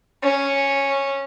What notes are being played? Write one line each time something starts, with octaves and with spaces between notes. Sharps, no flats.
C#4